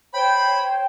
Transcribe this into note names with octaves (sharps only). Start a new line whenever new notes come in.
C5 C#5 G5 B5